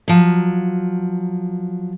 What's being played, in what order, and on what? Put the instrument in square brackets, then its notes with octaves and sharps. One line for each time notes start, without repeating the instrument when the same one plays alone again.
[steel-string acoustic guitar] F3 F#3